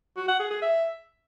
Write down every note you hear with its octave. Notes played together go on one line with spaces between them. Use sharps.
F#4
F#5
G#4
G#4
E5